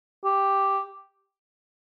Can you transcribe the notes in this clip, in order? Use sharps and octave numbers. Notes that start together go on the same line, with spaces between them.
G4